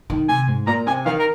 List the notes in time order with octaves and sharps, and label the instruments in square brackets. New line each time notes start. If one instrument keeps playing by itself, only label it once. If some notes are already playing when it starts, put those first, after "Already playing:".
[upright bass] D#3
[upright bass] C3 [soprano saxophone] G#5
[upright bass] G#2
[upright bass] A#2 [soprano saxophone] A#5
[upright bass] C3 [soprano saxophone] G#5
[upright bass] D#3 [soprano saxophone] F5
[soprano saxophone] A#4